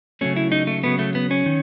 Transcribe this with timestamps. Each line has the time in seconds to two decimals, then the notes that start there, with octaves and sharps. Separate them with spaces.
0.21 C#3 F#3 A3 C#4
0.36 E4
0.52 D#4
0.67 A3
0.84 C#3 F#3 A3 B3
0.99 A3
1.15 B3
1.31 C#4
1.46 D#3